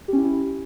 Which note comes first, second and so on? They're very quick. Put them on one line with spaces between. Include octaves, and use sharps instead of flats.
G4 C#4 E4